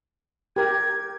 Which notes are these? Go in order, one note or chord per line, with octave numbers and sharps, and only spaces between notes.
G4 A#4 G#6